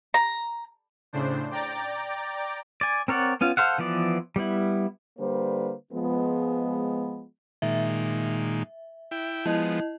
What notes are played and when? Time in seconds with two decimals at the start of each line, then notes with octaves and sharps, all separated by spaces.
0.14 A#5
1.13 A2 C#3 D4 C5
1.51 D5 G5 A#5 D6 A6
2.81 D5 G#5
3.08 C4 A#4 C#5 D5 F#5
3.41 B3 C#4 F4
3.57 A4 C5 F5 F#5
3.78 E3 F3 B3 D5
4.36 G3 B3 E4
5.19 D3 G3 A#3 B4 C5
5.93 F3 G#3 B3
7.62 A#2 D#3 G#3 E5
9.11 E4 G5
9.46 F3 G#3 B3 E4 D#5